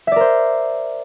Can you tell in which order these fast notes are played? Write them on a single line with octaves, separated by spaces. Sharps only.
E5 D5 A#4 C5